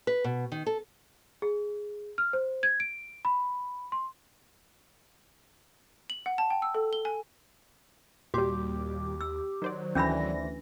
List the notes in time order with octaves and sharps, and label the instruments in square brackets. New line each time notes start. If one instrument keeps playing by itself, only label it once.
[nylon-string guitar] B4
B2
D#3
A4
[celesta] G#4
F6
C5
G#6
D7
B5
C6
[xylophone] F#7
F#5
A5
G5
E6
A4
G7
G#5
[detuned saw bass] D#2 [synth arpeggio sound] A#2 G3 [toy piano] F#4 [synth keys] G4 D6
[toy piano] E6
[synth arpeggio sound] D#3 C5 D5 [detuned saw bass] F#3
[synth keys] D2 E3 A#6 [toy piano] C#4 D4 B5